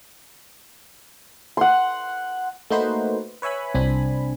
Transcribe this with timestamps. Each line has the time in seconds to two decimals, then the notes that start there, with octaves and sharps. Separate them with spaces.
1.57 F#5 C6
2.70 A3 A#3 D#4 F#4 B4 C5
3.42 B4 C#5 E5 G#5 B5
3.74 C2 C4 D4 G#5 B5